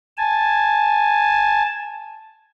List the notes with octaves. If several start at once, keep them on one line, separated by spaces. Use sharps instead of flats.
G#5 A5